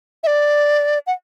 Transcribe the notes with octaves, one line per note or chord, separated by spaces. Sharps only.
E5
D5
F#5